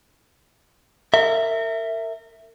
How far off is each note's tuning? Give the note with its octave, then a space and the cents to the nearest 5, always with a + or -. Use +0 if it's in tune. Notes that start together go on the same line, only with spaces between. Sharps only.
A#4 -30 E5 +0